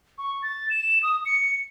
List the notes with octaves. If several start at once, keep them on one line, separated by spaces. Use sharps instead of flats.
C#6
A6
E7
D#6
C#7